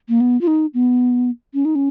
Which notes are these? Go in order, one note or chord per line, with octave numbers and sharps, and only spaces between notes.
A#3
B3
F4
D#4
B3
C#4
D#4
C#4